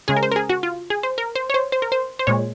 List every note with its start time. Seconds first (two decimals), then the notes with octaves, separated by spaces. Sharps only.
0.08 C#3 G#3 G#4
0.17 A#4
0.23 C5
0.32 A#4
0.36 G#4
0.50 F#4
0.63 F4
0.90 G#4
1.03 C5
1.18 A#4
1.36 C5
1.50 C#5
1.54 C5
1.72 C5
1.82 A#4
1.92 C5
2.19 C5
2.27 A#2 G#3 C#5